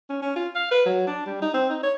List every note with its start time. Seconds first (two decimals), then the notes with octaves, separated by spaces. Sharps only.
0.10 C#4
0.22 C#4
0.36 F4
0.55 F5
0.72 B4
0.86 F#3
1.07 D4
1.26 G3
1.42 D#4
1.54 C4
1.70 D#4
1.83 C#5